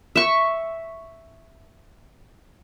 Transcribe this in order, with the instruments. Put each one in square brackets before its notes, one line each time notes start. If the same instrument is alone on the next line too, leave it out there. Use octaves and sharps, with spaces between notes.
[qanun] E5 C#6